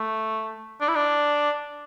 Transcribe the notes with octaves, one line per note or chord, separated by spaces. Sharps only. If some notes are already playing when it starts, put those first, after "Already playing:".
Already playing: A3
D4
E4
D4